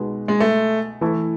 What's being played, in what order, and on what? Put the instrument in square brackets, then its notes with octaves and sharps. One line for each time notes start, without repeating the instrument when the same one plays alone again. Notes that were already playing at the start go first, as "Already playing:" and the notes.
Already playing: [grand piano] B2 G#3 D#4 G#4 B4
[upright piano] G#3
A3
[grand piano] E3 A3 E4 A4